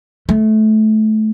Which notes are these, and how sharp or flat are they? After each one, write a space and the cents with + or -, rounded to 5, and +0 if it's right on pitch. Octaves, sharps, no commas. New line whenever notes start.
A3 -20